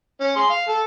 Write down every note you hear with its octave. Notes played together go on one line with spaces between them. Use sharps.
C#4
G#4 C6
F5
A4